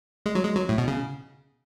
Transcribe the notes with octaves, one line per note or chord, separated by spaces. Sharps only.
G#3
F#3
G#3
F#3
A2
B2
C#3